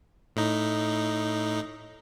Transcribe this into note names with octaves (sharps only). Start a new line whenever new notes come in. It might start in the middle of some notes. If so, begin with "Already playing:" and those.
A2 D#4